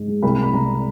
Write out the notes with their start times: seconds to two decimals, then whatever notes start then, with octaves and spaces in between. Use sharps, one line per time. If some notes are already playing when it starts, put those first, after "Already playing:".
Already playing: G#2
0.08 G#3
0.23 C2 B5
0.38 C2 B5
0.53 C2 A#5